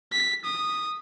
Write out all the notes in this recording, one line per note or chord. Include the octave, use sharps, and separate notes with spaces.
B6
D#6